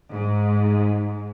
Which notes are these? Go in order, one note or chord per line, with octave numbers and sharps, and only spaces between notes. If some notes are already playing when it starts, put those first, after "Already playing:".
G#2